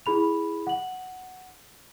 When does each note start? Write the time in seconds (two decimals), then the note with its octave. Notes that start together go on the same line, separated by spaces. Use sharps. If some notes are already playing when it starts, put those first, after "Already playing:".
0.06 E4 G#4 B5 F7
0.67 F#5 F#7